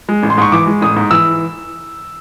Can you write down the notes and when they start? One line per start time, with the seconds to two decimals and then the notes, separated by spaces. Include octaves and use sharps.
0.09 G#3
0.23 A1
0.30 C6
0.38 G#2 C#6
0.52 E3 D6
0.67 G#3
0.81 A1 D#6
0.96 G#2
1.11 E3 E6